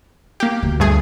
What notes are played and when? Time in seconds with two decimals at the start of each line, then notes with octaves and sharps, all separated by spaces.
0.40 A#3 G4
0.63 D2
0.80 G2 A3 G#4